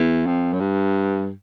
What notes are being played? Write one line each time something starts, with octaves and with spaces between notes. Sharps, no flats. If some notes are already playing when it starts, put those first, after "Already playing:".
Already playing: E2
F2
F#2
G2